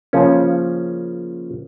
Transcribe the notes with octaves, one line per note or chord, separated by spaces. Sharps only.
C#3 F3 A#3 C#4